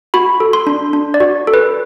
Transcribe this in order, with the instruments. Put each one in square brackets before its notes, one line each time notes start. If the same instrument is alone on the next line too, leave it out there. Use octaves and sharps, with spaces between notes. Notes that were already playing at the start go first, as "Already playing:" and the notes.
[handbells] F#4 B5
A4
C6
D4
D4
D5
F#4
A4
B4